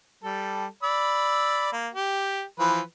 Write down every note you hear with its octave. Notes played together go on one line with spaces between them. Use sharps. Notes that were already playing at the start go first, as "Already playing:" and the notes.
G3 A4
D5 B5 E6
A#3
G4
E3 F3 B4